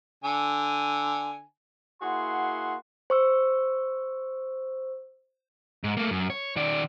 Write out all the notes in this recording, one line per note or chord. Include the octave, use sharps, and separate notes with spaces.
D3 G#5
A#3 E4 F#4 G#4 F#5 C6
C5 C#6 E6
G#2
A3 A#3
F#2
C#5
D#3 D5